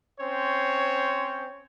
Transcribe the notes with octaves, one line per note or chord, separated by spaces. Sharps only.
C4 C#4 C5 C#5